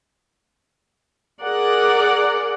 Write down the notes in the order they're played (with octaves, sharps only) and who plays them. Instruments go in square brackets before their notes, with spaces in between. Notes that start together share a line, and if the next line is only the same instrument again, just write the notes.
[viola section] G#4 A#4 D5 F#5